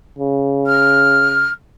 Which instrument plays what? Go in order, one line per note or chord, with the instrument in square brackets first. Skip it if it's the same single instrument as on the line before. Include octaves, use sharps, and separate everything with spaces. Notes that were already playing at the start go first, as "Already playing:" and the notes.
[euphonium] C#3
[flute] F6